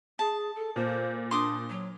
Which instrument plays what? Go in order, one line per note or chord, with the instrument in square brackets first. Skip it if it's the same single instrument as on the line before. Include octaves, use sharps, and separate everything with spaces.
[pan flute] G#4 [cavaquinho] A5
[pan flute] A4
[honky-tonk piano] A#2 [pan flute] C5
[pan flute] D4 [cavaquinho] C6 D6 D#6
[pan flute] F#3